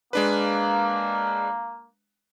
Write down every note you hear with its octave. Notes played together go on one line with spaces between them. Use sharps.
G#3 A#3 D4 B4